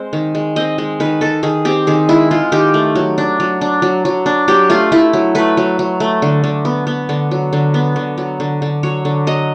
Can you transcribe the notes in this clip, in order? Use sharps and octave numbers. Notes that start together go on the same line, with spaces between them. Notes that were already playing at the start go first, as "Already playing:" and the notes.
Already playing: G#3 C4 C5
D#3
G#3
C4 D#5
G#3
D#3 B4
D#3 A4
D#3 G#4
C4 G4
D#3 G#4
G#3 E4
G#3 F4
D#3 G4
A3
F#3
D4
F#3
D4
F#3
F#3
D4
F#3 G4
A3 F4
A3 E4
F#3
A3 B4
F#3
F#3
A3
D3
D3
B3
B3
D3
F#3
D3
B3
D3
F#3
D3
D3
F#3 C#5
D3
F#3 D#5